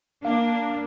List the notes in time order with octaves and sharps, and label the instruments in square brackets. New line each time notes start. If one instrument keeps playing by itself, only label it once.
[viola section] A#3 [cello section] D4 [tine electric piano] F5